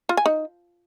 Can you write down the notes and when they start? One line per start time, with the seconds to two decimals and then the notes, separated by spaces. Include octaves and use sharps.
0.09 F4
0.17 G#5
0.26 D#4